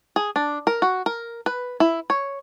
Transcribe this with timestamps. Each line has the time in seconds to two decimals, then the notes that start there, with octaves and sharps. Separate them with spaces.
0.16 G#4
0.36 D4
0.67 A#4
0.82 F#4
1.06 A#4
1.46 B4
1.80 E4
2.10 C#5